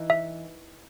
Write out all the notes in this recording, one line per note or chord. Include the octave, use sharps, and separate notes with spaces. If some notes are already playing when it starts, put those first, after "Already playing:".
Already playing: E3 D#4
E5